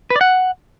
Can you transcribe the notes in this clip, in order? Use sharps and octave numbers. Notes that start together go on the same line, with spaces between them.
B4
D5
F#5